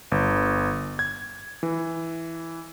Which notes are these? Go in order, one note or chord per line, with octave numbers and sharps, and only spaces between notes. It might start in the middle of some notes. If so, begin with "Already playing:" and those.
G1
G#6
E3